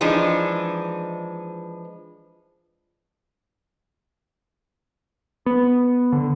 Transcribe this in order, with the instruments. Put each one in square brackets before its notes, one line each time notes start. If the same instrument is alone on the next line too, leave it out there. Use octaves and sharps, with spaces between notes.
[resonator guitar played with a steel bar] E3 F3 G#3 D4 D#4
[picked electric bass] B3
D3